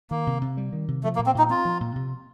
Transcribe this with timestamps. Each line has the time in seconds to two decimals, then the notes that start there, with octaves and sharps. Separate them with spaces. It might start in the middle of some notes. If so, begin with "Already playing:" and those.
0.10 D#3 A#3
0.27 C3
0.42 C3
0.57 G3
0.73 D#3
0.88 C3
1.04 F3 A3
1.15 A#3
1.19 A#2
1.26 C4
1.35 A#2 D#4
1.50 C4 F4
1.65 F3
1.81 A#2
1.96 C3